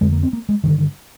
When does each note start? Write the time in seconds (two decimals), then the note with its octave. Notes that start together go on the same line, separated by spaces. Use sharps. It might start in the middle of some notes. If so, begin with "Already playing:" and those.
0.01 F2 D3 G#3
0.12 A#3
0.23 C4
0.33 A#3
0.49 G#3
0.64 G2 D3 D#3